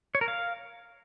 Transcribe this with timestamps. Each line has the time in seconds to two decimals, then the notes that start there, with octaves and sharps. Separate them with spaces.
0.15 C#5
0.21 A#4
0.28 F5